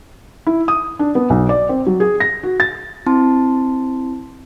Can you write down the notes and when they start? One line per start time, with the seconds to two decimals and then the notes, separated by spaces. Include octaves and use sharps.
0.47 E4
0.68 D#6
0.99 D4
1.15 B3
1.30 B1
1.49 D5
1.69 C4
1.86 F#3
2.00 G#4
2.20 A#6
2.43 F#4
2.60 A6
3.06 C4 E4 A5 C6